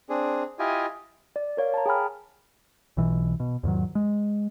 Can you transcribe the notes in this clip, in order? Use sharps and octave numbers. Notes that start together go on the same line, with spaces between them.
C4 D4 G#4
E4 F4 G4 D#5 G#5
D5
A#4 C#5 F5
A5 A#5
G#4 G5 G#5 B5 F6
B1 B2 E3
B2
E2 G#2 D#3 F#3
G#3